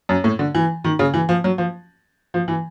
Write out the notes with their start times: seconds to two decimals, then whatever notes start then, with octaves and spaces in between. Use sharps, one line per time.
0.09 F#2
0.24 A2
0.39 D3
0.55 E3
0.84 D#3
0.99 C#3
1.14 E3
1.29 F3
1.44 F#3
1.58 F3
2.34 F3
2.48 E3